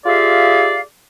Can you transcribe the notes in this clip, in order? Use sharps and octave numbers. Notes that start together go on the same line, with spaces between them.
F4 G4 G#4 D5 E5 F5